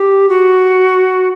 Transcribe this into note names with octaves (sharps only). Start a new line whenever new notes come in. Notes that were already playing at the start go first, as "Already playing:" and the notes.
Already playing: G4
F#4